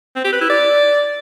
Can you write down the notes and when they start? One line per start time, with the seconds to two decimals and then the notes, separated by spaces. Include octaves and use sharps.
0.16 C4
0.24 G4
0.33 B4
0.41 E4
0.50 D5